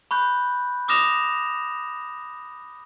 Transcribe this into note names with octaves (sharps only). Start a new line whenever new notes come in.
B5 C#6 F#6 G6
D6 D#6 F6 A#6 E7 F7